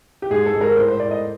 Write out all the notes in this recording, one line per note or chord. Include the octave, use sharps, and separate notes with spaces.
G4
G#2 G#4
A4
G#2
A#4
A2 C5
C5
A2 D5
D#5